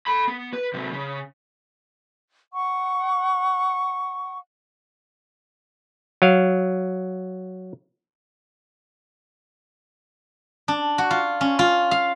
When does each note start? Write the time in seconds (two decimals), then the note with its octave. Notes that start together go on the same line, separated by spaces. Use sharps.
0.07 A4 B5
0.28 B3
0.53 B4
0.74 C3 F#3
0.93 C#3
2.53 F#5 C#6
6.22 F#3 F5
10.68 D4
10.98 F#4
11.11 F4
11.41 C#4
11.59 F4
11.91 F5